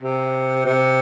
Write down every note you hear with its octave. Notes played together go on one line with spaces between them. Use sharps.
C3
C3